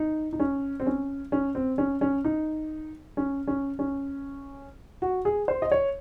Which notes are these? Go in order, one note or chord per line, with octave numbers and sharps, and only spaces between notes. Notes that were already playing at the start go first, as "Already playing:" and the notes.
Already playing: D#4
D#4
C#4
C4
C#4
C#4
C4
C#4
C#4
D#4
C#4
C#4
C#4
F#4
G#4
C5
D#5
C#5